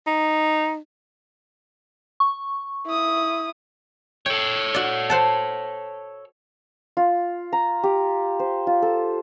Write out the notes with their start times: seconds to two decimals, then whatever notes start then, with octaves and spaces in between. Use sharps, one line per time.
0.07 D#4
2.20 C#6
2.86 E4 D#6
4.26 A4 C#5 G5
4.74 F#4 D5
5.10 C5 F#5 A5
6.97 F4
7.52 A#5
7.83 G4
8.39 C5
8.67 F4
8.82 A4